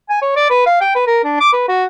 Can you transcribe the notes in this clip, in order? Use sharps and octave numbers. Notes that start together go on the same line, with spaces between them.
G#5
C#5
D5
B4
F5
G5
B4
A#4
D4
D6
B4
F#4